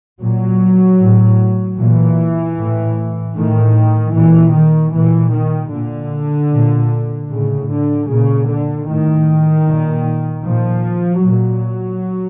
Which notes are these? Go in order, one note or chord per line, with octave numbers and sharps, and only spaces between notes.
A#2 F#3
A2
A#2 E3
A2
A2 D#3
A#2 E3
D#3
A#2 E3
D#3
A#2 D3
A#2
A2 C#3
D3
A#2 C#3
D3
A2 D#3
A#2
A#2 F3
A#2 F#3